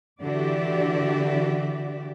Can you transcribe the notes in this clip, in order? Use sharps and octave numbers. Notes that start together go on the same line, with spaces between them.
D3 E3 F#4 G4 D5 E5